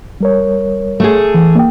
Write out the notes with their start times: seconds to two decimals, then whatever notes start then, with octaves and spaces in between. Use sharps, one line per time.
0.20 G3 A#4 C#5
1.00 A3 G#4
1.34 E3
1.55 A#3 G5